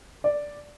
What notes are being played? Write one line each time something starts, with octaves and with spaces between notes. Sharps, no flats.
D5